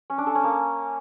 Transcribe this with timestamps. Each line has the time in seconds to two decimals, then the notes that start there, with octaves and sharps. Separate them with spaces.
0.10 C#4
0.18 D4
0.27 A4
0.35 C#4
0.44 A#3